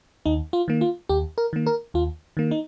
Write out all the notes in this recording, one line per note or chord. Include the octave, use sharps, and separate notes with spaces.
D#2 D#4
F4
D#3 A#3
F4
D#2 G4
A#4
D#3 A#3
A#4
D#2 F4
D#3 A#3
D#4